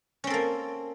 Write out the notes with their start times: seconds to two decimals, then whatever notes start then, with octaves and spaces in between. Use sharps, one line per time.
0.24 C#4
0.27 C4
0.30 A4
0.34 A#3